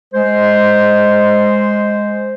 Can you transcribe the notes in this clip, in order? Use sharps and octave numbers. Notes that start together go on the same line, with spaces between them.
G#3 C5